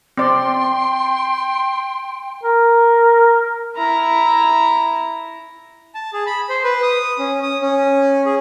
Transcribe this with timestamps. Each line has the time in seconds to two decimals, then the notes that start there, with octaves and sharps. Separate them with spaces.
0.17 C4 D5 G5 C6
2.42 A#4
3.77 E4 A#5
5.95 A5
6.13 G#4
6.26 B5
6.49 C5
6.64 B4
6.83 D#6
7.19 C#4
7.43 D#6
7.62 C#4
8.26 G#4